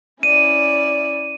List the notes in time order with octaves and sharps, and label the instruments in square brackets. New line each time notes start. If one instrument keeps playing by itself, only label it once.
[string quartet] C#4 E4 D5 [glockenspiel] D#7